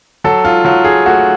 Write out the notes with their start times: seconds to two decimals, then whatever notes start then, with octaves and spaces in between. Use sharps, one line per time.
0.24 F#3 A4
0.45 F4
0.65 F#3 F4
0.85 G#4
1.06 A3 F#4